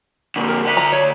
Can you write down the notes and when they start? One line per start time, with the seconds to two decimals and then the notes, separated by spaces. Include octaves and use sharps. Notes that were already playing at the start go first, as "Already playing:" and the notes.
0.36 A#2 D3
0.48 A#4
0.64 D3 E5
0.77 A#5
0.92 C#5